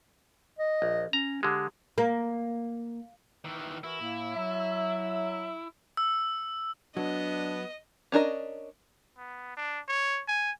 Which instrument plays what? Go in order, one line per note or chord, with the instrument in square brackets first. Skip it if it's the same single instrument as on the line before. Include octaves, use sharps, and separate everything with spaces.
[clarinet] D#5
[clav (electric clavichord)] A#1
[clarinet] C#4 [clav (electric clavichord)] A#5
[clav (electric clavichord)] D3 G#3 [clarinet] G4
[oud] A#3
[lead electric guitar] D#3 E3
[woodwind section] E3 F#4 A#4 [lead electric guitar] E4
[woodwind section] A2 A#3
F#3 E5
[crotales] E6
[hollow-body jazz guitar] F#3 [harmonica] B3 [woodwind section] D4 [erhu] D#5
[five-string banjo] C#4 D4 A#4 D#5
[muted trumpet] B3
D4
C#5
G#5